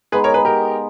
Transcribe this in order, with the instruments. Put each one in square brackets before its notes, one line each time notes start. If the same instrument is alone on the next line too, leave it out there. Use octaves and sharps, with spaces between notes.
[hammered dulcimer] G#3 B3 D#4 [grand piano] G#4 B4
[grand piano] A#4 C#5
G#4 B4
G4 A#4